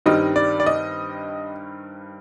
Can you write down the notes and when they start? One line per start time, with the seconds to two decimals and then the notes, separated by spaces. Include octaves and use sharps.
0.06 G2 D#3 G3 C4 D#5
0.36 D5
0.60 D5
0.66 D#5